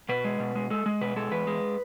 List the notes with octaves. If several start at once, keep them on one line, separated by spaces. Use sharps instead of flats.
B2 B4
G#3
B2
G#3
G#3 A4
G#3
B2 B4
G#3 A4
E2 B4
G#3